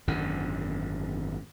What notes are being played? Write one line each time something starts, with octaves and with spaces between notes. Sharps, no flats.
G#1 F#2 D3